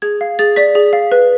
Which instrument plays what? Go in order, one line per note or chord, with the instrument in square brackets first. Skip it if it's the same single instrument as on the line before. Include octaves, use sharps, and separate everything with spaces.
[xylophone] G#4 G#6
F5
G#4 A6
D5 B6
G#4
F5
B4